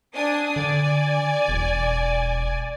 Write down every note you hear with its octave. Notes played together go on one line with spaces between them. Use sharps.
D4 G#5 D#6
D3 D5 G#5
E1